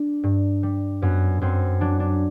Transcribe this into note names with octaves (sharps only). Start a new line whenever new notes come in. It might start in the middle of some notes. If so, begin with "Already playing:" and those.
Already playing: D4
G2
G3
F#2 B3
F#2 C4
F#3 D4
D4